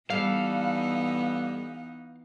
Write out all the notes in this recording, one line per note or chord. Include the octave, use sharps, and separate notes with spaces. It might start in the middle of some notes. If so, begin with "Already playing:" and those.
E3 G3 B3 D#4 A4 F5